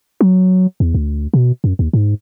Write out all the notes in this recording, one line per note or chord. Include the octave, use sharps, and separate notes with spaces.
F#3
E2
D2
B2
F#2
D#2
G#2